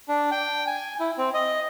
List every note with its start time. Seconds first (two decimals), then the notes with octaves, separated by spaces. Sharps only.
0.08 D4
0.32 G5
0.67 G#5
1.00 E4
1.18 C4
1.34 D#5